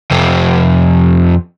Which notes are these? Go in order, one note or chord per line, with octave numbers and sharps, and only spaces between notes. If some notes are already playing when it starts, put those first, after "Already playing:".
F2 C3